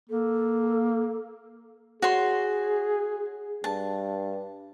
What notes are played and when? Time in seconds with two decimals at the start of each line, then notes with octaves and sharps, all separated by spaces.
0.10 A#3 A4
2.02 F#4 G#4 C#5 C6
3.64 G2 A5